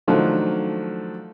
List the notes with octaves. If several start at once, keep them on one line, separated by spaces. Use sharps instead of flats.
D#3 F3 F#3 A3 D4 F4